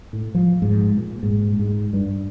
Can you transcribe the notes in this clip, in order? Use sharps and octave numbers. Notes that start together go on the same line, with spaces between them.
A2
F3
G#2
A#2
G#2
G#2
G2